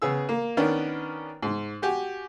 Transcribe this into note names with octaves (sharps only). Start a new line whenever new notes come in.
C#3 B3 G#4 E6
A#3
D#3 B3 C#4 D4 A#4 B4
G#2
F#4 G4 G#5